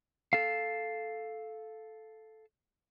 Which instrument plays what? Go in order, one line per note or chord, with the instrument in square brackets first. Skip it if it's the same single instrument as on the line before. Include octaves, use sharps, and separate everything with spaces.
[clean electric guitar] A4 F5